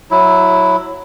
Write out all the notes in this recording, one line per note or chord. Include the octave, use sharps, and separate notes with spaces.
F#3 E4